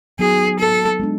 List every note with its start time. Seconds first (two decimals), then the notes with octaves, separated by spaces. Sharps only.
0.19 F#3 B3 D#4 F#4 G#4
0.59 A4
1.00 G#3 B3 D4